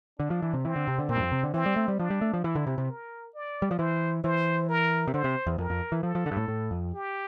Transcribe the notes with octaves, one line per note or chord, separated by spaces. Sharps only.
D3 D4
F3
E3
C3
E3 C4
D3
C3
D3
A#2 C4
G2
F2
C3
D3
E3 C4
G3
A3
G3
F3 D4
G3
A3
F3
E3 E4
D3
C3
C3
A#4
D5
G3
F3
E3 C5
E3 C5
A#4
C3
D3 C5
C3
E2
F2 A#4
F2
E3
F3 A4
F3
D3
G2
A2
A2
F2
G4